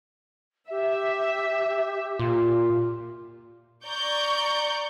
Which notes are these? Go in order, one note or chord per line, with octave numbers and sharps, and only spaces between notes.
G4 E5
A#2 F4
D5 A#5 C#6 G6